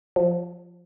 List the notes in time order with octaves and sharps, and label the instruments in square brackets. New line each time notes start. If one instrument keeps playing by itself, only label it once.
[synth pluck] F3